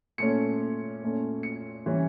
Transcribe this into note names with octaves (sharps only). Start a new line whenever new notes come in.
A#2 A3 C#4 C#7
A#2 A3 C#4
C#7
E3 G3 C#4